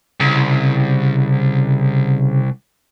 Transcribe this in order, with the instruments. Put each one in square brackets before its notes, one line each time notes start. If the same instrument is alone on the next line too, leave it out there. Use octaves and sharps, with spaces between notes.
[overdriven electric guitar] C2 [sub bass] C#3